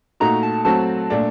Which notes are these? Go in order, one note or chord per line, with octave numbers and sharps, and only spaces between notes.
A#2 A3 D#4 F#4 A#5
A5
F#3 A3 C4 F#4 A5
A#2 A3 D4